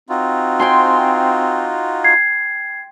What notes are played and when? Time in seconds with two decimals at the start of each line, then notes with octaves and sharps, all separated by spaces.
0.09 C4 D#4 F4 F#4
0.59 G5 G#5 C6
2.04 G#6 C7